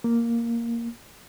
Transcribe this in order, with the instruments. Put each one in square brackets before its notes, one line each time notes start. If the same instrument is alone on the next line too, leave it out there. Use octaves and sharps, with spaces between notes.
[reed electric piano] A#3